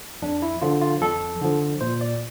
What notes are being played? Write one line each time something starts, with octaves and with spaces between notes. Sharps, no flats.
F2 D4
E4
D3 F3 F4
F4
F2 A4
D3 F3
A#2 C5
D5